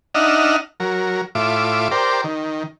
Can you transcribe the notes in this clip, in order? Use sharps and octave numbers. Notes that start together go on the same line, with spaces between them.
D4 D#4 D#5 E5 F#5 F6
F#3 A#4
A2 F4 E5 D6
G4 A#4 C5 D5
D#3